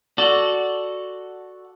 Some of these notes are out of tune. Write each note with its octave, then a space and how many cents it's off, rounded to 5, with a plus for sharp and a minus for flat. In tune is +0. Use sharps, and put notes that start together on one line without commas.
F#4 +0 A4 +0 D5 +0